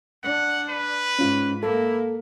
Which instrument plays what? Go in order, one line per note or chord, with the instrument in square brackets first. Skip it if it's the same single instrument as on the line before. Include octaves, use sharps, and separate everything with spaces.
[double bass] D4 [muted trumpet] F#5
[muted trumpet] B4
[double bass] G#2 [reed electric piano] C#4 F4
[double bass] A#3 [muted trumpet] E4 [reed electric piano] A4